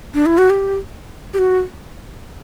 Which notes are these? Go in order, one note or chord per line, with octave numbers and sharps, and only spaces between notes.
D4
E4
F#4
G4
G4
F#4